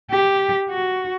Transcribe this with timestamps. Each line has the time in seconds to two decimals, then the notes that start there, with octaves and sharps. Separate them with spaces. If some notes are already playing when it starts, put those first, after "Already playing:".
0.11 G4
0.69 F#4